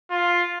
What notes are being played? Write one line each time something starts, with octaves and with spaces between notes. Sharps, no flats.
F4